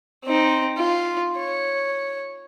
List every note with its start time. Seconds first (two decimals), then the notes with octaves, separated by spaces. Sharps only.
0.24 C4 D#4
0.78 F4
1.37 C#5